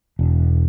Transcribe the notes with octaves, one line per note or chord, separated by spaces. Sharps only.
E1